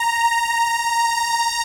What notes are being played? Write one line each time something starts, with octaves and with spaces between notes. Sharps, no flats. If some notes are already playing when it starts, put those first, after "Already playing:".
Already playing: A#5